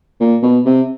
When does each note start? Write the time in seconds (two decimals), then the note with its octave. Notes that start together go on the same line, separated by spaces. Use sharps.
0.20 A#2
0.43 B2
0.66 C3